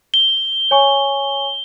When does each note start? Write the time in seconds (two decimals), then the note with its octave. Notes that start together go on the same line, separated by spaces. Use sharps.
0.14 G7
0.71 C#5 G#5 C#6